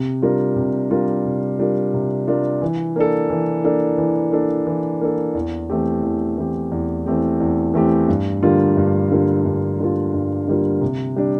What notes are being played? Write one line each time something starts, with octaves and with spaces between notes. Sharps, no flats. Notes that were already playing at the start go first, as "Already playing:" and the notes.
Already playing: C3
G3 D4 F4 A#4
C3
G3 D4 F4 A#4
C3
G3 D4 F4 A#4
C3
G3 D4 F4 A#4
E3
A#3 D4 A4
E3
A#3 D4 A4
E3
A#3 D4 A4
E3
A#3 D4 A4
E2
E3 A3 C4 G4
E2
E3 A3 C4 G4
E2
E3 A3 C4 G4
E2
E3 A3 C4 G4
G2
D3 G3 A#3 F4
G2
D3 G3 A#3 F4
G2
D3 G3 A#3 F4
G2
D3 G3 A#3 F4
C3
G3 D4